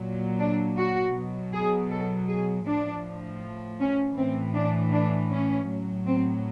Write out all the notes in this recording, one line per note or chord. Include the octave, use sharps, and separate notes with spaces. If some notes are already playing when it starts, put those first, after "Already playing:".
Already playing: A#2 F#3
D4
F#4
B2 F#3
G#4
A4
G#4
A2 F3 D4
C#4
A2 E3 C4
D4
D4
C#4
A2 F#3
C4